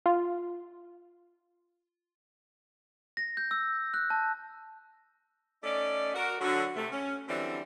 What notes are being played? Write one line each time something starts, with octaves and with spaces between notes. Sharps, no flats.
F4
A#6
G6
E6
F#6
A5
A3 C#4 D#4 D5
F#4 A#4
D3 F#3 F#4
C3 A3
C#4
D3 E3 F#3 G3 C4 D4